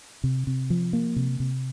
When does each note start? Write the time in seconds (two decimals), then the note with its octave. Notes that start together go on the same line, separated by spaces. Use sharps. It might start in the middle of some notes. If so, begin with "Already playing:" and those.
0.24 C3
0.47 C3
0.70 F3
0.93 A#3
1.16 C3
1.40 C3